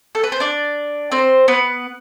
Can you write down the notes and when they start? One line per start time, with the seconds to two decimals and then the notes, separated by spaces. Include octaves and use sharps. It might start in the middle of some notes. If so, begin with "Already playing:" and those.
0.15 A4
0.24 B4
0.32 C5
0.40 D4 D5
1.12 C4 C5
1.48 B3 B4